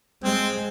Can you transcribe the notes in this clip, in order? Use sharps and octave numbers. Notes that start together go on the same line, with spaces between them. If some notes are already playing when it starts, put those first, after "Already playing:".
G#3 C4